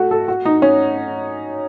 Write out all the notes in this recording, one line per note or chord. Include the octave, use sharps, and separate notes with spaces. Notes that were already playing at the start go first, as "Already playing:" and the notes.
Already playing: A3 F#4
A4
F#4
D#4
C#4